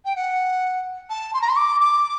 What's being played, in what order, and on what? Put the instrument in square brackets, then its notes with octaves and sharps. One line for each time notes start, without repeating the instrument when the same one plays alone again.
[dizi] G5
F#5
A5
C6
A#5
C6
D6
D6